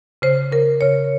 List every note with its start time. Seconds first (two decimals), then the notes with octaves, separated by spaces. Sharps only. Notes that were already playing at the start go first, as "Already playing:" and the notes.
0.22 C#3 C5
0.52 C#3 A#4
0.81 C#3 C#5